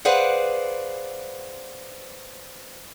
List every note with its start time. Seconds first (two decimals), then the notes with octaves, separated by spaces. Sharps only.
0.05 G#4 B4 C5 D5 F5 F#5